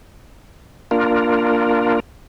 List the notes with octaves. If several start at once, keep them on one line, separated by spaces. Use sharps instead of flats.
A#3 D4 F4 A#4